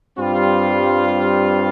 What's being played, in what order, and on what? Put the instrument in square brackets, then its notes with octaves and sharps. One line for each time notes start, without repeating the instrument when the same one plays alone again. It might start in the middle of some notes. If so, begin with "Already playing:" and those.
[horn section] G2 G3 C4 F4